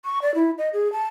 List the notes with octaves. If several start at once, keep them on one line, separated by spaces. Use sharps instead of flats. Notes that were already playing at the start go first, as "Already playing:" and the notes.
C#6
D5
E4
D#5
G#4
A5